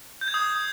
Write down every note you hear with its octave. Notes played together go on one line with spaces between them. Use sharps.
G6
G#6
D#6